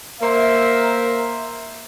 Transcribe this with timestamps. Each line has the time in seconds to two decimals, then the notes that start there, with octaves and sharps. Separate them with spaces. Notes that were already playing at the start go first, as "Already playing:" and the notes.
0.20 A#3 A#4 C5 E5